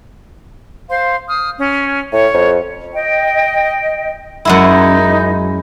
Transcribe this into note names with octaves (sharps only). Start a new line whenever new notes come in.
C5 F5 C6
D#6 F6
C#4
A2 C#5
F2
D#5 G5
F#2 G#3 E4 F#5
D#4